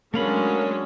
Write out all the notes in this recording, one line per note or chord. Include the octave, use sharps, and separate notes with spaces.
F#3 G#3 A3 C#4 D4 A#4 F5 B5